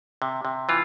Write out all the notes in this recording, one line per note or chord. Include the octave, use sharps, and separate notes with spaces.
C3
C3
E3 F4